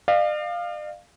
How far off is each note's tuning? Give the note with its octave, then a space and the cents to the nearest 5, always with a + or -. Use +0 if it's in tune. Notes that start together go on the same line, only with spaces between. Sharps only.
D5 +45 F5 +0